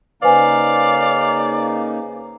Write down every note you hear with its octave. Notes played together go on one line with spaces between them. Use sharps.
C#3 A#3 D#4 B4 C5 D5 F5 G#5